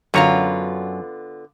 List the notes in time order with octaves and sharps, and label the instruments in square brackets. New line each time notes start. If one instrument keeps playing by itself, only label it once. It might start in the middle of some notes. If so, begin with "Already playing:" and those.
[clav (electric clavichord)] F#2 C#5 A#5 [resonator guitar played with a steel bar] D3 B3 F4